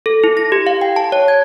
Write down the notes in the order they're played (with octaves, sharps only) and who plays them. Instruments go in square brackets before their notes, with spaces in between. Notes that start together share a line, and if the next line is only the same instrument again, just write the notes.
[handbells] A4
E4
A#6
G4
F5
G5
A5
C#5
G#6